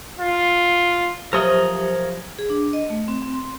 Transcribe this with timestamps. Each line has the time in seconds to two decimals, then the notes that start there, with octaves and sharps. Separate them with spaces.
0.19 F4
1.33 F3 F#3 G4 A#4 C#5 E5 D#6
2.39 G#4
2.50 D4
2.73 D#5
2.90 A3
3.08 C4
3.22 C4
3.33 C6